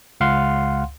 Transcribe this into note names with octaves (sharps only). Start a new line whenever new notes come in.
C#2 F5 F#5 C6